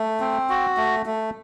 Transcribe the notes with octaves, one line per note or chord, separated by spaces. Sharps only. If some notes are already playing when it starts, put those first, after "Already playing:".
Already playing: A3
C4
F#4
A3
A3